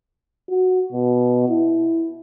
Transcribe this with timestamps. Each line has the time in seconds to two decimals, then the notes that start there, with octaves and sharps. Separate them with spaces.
0.49 F#4
0.93 B2
1.49 E4